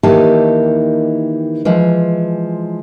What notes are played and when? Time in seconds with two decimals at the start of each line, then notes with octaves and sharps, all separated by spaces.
0.03 D#3 E3 A#3 D#4 G4 A5
1.65 E3 F3 G#3